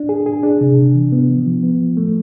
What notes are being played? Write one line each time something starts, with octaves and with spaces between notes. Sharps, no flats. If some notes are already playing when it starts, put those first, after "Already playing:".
Already playing: D4
G#4
G#4
D4
C3
C3
E3
B3
F3
F3
B3
F3
A3